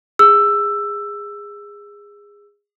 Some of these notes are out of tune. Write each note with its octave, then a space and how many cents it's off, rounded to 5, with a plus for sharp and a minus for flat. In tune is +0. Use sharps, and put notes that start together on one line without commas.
G#4 -20 E6 +10